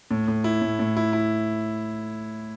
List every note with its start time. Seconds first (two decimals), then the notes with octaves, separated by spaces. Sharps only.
0.11 A2
0.28 A2
0.44 E4
0.62 A2
0.79 A2
0.97 E4
1.13 E4